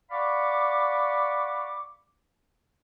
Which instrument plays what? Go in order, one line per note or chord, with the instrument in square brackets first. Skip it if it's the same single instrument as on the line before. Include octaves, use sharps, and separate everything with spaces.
[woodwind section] D5 F5 F#5 B5 C#6 D6